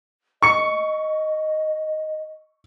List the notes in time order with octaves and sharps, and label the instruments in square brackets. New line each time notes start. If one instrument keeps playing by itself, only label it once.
[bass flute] D#5 [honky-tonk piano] C#6 C#7